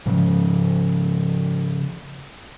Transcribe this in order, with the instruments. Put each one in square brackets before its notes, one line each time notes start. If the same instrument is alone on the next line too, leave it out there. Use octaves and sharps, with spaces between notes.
[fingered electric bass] G#2 C#3 F3